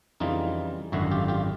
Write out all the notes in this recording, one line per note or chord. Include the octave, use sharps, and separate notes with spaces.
F2 C#3 E3 G3 D#4 F4
G#1 F#2 D3 E4 F#4
F4 G4
F4 G4